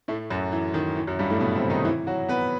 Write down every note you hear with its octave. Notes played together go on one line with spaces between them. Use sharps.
A2 A3
F#2 F#3
E3
D#3
E3
F#2 F#3
G2 G3
A2 A3
B2 B3
C3 C4
D#3 D#4
E3 E4
F#3 F#4
B3 B4